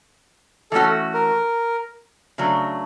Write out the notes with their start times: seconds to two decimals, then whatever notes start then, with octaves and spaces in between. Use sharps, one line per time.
0.72 E3 A3 C#4 F#4 A4
1.14 A#4
2.38 C#3 F#3 A3 D4